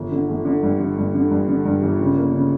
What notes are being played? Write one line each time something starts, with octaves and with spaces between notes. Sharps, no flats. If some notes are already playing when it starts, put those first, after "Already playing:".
Already playing: G1
D3
G1
D3
G2
D3
G2
D3
G2
D3
G2
G1
C#3
A#3
C#3